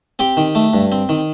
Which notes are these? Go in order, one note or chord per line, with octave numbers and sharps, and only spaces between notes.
C4 G4 G5
D#3
A3
G2
C4
D#3